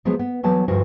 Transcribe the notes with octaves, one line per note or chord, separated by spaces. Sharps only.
F3 F#3 G#3 B3
B3
E3 F#3 B3 A5
D2 G2 F3 F#4